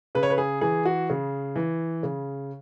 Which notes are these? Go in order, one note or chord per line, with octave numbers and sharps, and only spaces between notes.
C#3 B4
C#5
B4
G#4
E3 G#4
F#4
C#3
E3
C#3